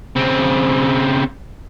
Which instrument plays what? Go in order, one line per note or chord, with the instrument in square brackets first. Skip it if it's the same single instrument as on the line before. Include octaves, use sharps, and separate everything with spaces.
[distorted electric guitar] C#3 C4